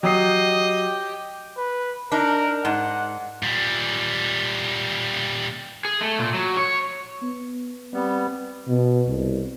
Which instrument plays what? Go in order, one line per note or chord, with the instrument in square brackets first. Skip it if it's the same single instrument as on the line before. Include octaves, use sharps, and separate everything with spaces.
[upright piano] F#3 D#6 C7 [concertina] G4 G5 [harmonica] D#5
[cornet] B4
[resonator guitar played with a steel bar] D4 D#4 [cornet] A#4
[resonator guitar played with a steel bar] G#2 [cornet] F#5
[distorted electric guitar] A#2 G3
[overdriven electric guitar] G#4
A3
A#2
F#3
C#5
[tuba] B3
[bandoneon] G3 B3 [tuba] C4
[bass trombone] B2
C2